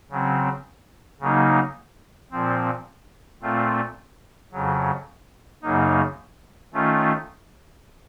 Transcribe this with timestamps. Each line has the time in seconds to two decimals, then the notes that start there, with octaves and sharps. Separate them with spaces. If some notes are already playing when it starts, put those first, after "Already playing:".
0.10 C#3 F#3 C4
1.21 C#3 F#3 A#3 D#4
2.31 A#2 F3 C4
3.42 A#2 A3 C4 F4
4.52 F2 C#3 F#3
5.63 F#2 C#3 F#3 A#3 D#4
6.74 D#3 A3 C#4 F4